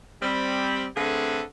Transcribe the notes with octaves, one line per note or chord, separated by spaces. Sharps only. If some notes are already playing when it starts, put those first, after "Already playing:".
G3 C4 B5
D3 A3 C4 G#4 A4 B4